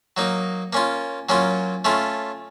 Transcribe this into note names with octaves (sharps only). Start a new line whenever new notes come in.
F#3 A#3 D#4
A#3 C#4 F4
F#3 A#3 C#4 F4
A3 C#4 F4